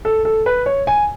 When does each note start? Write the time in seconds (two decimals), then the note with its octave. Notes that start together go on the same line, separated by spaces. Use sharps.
0.05 A4
0.25 A4
0.46 B4
0.66 C#5
0.87 G#5